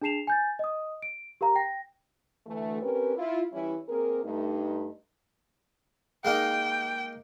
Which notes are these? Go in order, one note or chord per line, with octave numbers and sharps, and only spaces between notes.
D4 G#4 A5 C7 E7 F7
G#5 G6 A6
D#5 D#6
D7
G4 A#4 F5 A#5
G5 A#6
D2 E3 A3
C4 C#4 G4 A#4 B4
E4 F4
E3 G3 C#4 E4
A#3 C4 G#4 A#4
G2 A3 D#4
G#3 A#3 D#4 G5